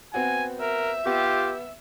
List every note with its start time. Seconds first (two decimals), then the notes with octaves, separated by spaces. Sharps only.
0.14 B3 C4 F#4 G#5
0.61 A#4 E5
1.06 B3 F4 G4